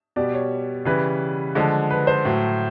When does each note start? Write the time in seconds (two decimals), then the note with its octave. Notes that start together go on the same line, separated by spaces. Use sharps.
0.16 B2 G3 D5
0.34 C#5
0.85 C#3 E3 G3 B4
1.55 D3 F3 G#3
1.90 B4
2.07 C5
2.25 A2 F#3